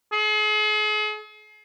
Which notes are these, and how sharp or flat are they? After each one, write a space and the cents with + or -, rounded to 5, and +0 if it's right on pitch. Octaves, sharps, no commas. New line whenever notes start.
G#4 +40